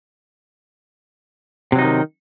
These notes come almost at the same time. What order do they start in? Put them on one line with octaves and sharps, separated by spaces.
C3 F#3 D#4 F3 D#3